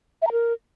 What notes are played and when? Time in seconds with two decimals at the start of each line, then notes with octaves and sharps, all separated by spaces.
0.22 E5
0.27 A#5
0.32 A#4